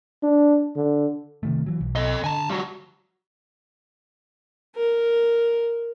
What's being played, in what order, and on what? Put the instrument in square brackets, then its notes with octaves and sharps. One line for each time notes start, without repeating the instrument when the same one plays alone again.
[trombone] D4
D3
[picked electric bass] C3 D#3 A3
E3 F#3
B1
[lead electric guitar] A4 D#5
[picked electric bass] D3 [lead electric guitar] G#5 A5
[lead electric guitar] G3 F#4
[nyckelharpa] A#4